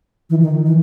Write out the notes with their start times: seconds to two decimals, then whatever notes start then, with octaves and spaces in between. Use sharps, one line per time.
0.30 E3
0.42 D#3
0.66 E3